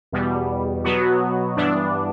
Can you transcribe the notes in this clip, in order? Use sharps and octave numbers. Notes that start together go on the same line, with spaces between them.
E2 B2 G3 B3
B2 F#3 B3 F#4
G2 E3 B3 D4